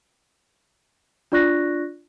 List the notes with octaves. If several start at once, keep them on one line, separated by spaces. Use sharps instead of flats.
D4 F4 D5 C#6 F#6 A#6